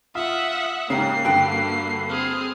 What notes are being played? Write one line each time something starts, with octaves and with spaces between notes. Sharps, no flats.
F4 E5 F#5 D#6
G#2 C#3 A#3 G4 F5 A#5 C7
G2 D3 D4 F#4 G5
C4 G#4 F6